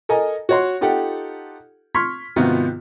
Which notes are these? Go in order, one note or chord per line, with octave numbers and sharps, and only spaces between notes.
A4 A#4 D#5 G#5 A#5
F#4 C#5 C6
D#4 F4 G4 A4 F#5
C6 C#6 F6 G#6 B6
G#2 C3 D#3 B3 F4 F#4